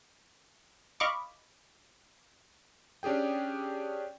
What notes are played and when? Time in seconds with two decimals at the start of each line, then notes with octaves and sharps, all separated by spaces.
1.00 D#5 F5 B5 C#6 D6
3.03 C#4 D4 G4 G#4 G5